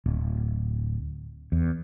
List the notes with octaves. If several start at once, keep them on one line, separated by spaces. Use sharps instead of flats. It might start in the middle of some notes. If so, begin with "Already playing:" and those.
D1
E2